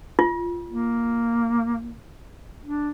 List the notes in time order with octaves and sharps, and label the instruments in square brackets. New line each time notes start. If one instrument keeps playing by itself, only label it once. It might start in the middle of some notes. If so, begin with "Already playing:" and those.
[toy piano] F4
[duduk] A#3
D4